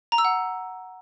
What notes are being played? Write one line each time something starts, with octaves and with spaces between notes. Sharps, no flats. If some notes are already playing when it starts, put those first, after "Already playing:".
A#5
E6
F#5